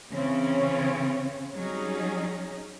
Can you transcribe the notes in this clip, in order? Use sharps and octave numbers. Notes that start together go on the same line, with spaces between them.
C#3 E3 C4 C#4 C#5
F#3 G3 C#4 D#4 G#4